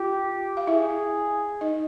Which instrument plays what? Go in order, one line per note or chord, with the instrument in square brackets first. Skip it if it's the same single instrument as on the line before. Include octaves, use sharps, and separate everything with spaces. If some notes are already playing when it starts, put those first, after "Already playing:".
Already playing: [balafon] F4 [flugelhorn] G4
[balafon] F5
[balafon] E4 E5 [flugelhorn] G#4
[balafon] D#4 D#5